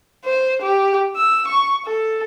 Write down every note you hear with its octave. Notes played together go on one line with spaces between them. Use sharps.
C5
G4
E6
C#6
A4